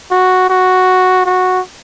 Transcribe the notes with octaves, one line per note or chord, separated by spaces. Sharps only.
F#4
F#4
F#4